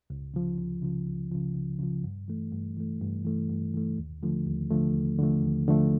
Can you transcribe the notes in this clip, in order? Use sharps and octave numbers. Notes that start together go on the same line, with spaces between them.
C#2
C#3 F3
C#2
C#3 F3
C#2
C#3 F3
C#2
C#3 F3
G2
E3 A3
G2
E3 A3
G2
E3 A3
G2
E3 A3
D#2
D3 F3 A3
D#2
D3 F3 A3
D#2
D3 F3 A3
D#2
D3 F3 A3